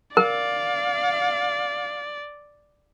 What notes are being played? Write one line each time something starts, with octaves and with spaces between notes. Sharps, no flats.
A#4 D5 F5